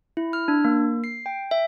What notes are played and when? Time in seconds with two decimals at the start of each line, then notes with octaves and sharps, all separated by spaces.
0.17 E4
0.33 F6
0.48 D4
0.65 A#3
1.04 C7
1.26 G5
1.51 E5